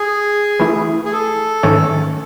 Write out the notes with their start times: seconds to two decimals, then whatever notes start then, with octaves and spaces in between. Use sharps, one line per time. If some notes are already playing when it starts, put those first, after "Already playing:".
Already playing: G#4
0.59 E3 A3 E4
1.05 G#4
1.12 A4
1.63 G#2 D#3 A3 C#4